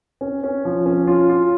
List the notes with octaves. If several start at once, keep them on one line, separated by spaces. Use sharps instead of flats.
C#4
C#4
F3
C#4
F4
F4